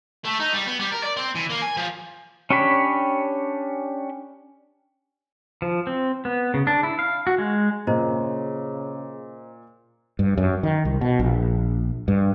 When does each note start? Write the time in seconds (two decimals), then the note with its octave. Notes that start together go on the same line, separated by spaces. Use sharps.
0.25 A3
0.40 D#4
0.53 G3
0.67 B3
0.79 G3
0.92 A#4
1.03 D5
1.17 C4
1.35 E3
1.50 A#3
1.62 G#5
1.77 F3
2.50 C#4 D4 G4 C#5 B5
5.62 F3
5.87 C4
6.25 B3
6.54 C#3
6.67 D4
6.83 E4
6.99 F5
7.27 F#4
7.38 G#3
7.87 A#2 C#3 C5 D#5 A#5
10.19 G2
10.37 F#2
10.63 D#3
10.85 C2
11.01 B2
11.19 A#1
12.08 G2